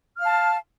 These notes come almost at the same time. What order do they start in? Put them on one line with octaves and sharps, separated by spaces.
F6 F5 A5